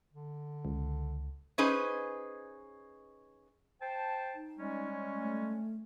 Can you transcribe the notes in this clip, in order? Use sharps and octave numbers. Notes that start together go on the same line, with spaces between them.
D3
C#2
C#4 D#4 G#4 B4 C5 D#5
C5 G5 A5
D#4
G3 G#3 C#4
A3